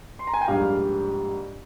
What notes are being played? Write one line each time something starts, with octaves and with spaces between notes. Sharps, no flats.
C6
A#5
G#5
G5
A#1 G#2 G3 F5